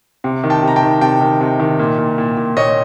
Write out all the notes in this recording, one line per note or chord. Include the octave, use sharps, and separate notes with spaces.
C3
D#3
G5 A5
C3 A#5
G5 A5
D#3
C3 G5 A5
D#3
C3
D#3
A#2
A#2
A#2
A#2
A#2 C#5 D#5